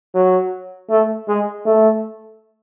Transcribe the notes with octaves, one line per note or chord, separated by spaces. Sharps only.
F#3
A3
G#3
A3